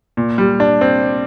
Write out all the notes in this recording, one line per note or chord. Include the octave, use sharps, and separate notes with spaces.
A#2
G3
D4
C4